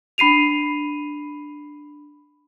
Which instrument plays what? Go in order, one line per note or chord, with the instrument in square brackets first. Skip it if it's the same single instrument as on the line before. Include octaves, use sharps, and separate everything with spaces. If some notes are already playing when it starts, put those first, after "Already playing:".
[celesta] D4 B5 C7 D#7 F7